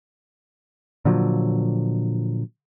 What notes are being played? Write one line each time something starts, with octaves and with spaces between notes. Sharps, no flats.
A#2 D3 F3 F#3